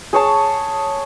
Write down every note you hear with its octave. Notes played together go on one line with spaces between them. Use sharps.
G#4 C#5 A5